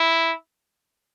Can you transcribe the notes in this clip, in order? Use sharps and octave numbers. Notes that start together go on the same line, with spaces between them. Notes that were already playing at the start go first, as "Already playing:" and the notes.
Already playing: E4